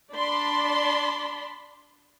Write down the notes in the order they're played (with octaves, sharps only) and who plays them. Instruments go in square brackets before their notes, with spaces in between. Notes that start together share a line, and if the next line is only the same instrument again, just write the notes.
[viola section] D4 D5 A5 B5 C6